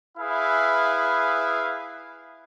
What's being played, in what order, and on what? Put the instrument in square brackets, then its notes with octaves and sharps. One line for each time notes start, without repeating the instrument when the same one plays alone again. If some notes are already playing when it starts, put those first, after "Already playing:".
[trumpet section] E4 G#4 B4 E5 F5